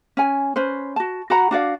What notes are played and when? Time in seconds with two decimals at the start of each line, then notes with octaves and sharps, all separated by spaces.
0.17 C#4 G#5
0.56 C#4 B4 C5
0.96 F#4 A5
1.30 F#4 F#5 A#5 B5
1.51 D4 F#4 D5 F5